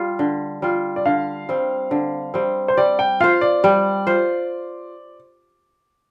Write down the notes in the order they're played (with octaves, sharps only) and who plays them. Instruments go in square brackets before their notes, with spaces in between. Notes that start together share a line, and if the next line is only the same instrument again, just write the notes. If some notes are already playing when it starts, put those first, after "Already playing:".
Already playing: [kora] G3 F4
D3
G3 F4
[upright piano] D5
[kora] D3 [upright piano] F5
[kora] G3 C4
D3
G3 C4
[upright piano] C5
[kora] G3 [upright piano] D5
[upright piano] G5
[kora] F4 C5 [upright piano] F5
[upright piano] D5
[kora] G3
F4 C5